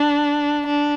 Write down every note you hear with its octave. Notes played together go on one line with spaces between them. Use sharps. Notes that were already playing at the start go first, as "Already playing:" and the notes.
Already playing: D4
D4